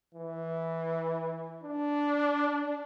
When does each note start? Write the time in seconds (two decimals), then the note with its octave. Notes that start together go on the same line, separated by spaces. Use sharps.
0.14 E3
1.64 D4